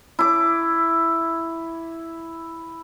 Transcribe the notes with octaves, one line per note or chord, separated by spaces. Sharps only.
E4 D6